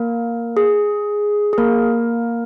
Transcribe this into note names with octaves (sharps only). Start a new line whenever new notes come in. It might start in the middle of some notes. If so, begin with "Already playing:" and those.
Already playing: A#3 A#4
G#4
G#4
A#3 A#4